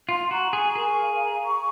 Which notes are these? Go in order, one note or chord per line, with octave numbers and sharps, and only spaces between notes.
F4 C6
F#4 A#5
G#4 C#6
G#4 A#4
F5
A#5
C#6